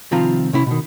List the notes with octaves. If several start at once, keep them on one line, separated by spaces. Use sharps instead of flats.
C2 D#3 F3 C4 F4 A#5
C3 C#4 E4
B2 D#3